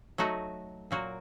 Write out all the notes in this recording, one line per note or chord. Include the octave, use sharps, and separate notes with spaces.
F#3 A3 D#4 F#4
A#2 F#3 A#3 F#4